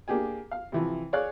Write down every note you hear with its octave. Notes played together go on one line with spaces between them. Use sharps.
A#3 D4 G4 G#4 G#5
F5
C3 E3 F3
G#4 C#5 D5 F5 F#6